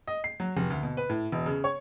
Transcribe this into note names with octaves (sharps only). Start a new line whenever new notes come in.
D#5
C7
F#3
F1
D2
B2
B4
A2
E1
C#3
C#5